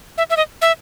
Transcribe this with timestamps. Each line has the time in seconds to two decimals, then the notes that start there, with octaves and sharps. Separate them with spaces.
0.18 E5
0.30 E5
0.37 D#5
0.62 E5